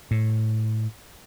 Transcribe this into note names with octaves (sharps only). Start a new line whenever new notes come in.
A2